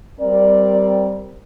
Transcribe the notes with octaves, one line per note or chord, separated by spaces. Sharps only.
G3 C4 A#4 D5